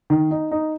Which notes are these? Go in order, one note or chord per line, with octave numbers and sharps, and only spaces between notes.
D#3
D#4
D#4